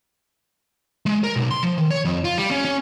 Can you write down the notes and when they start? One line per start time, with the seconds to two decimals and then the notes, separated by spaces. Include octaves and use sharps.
1.06 G#3
1.23 A#4
1.36 B1
1.51 C6
1.63 F3
1.78 D#3
1.91 C#5
2.05 F2
2.24 F4
2.38 G3
2.51 C#4
2.65 C#4